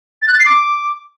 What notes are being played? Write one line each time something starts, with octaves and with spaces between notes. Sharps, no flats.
A6
F#6
A6
C7
D6